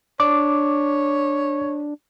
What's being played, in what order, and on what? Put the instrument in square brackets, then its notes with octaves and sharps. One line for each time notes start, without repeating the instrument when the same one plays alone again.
[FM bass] D4 [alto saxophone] C#5 [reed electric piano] D6